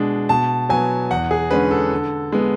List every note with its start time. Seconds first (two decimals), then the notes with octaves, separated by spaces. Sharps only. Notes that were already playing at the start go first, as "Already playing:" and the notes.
Already playing: B2 G#3 D4
0.29 B2 A5
0.69 F#3 B3 G#5
1.11 E2 F#5
1.31 G#4
1.51 D3 G#3 C#4 B4
1.71 A4
1.91 D3
2.32 G#3 B3